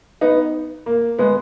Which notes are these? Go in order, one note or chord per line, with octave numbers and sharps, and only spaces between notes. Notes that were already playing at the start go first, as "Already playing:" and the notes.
B3 D#4
A#3
G#3 B3